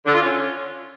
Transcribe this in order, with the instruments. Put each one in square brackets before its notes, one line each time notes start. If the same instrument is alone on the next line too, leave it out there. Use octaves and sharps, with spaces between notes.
[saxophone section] D3
F4
C#4